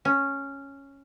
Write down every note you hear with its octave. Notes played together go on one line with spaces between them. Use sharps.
C#4